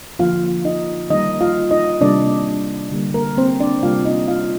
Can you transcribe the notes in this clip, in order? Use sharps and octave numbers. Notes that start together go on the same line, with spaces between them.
D3 F3 A#3 F4 F5
D#4 D#5
D#3 G3 A#3 D#4 D#5
F4 F5
D#4 D#5
C3 D#3 G3 A#3 D4 D5
D3 G3 A#3
A#3 A#4
C4 C5
D4 D5
C3 G3 A#3 F4 F5
D#4 D#5
F4 F5